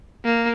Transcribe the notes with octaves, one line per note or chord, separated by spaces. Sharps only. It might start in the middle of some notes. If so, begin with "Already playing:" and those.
A#3